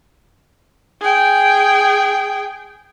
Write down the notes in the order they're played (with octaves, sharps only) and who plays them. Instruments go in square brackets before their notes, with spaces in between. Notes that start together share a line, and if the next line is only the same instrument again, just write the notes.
[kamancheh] G#4 G5